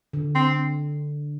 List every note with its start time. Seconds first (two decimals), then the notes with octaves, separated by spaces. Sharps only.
0.13 D3
0.35 C4